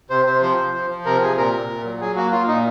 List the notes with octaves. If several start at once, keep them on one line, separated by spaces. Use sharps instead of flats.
C3 C5
C3 C5
F3 C5
F3
F3
F3
C3 A#4
C3 G#4
A#2 A#4
A#2
A#2
F#3
F#3 G#4
A#3 F#4
A#3 F4
A#2 D#4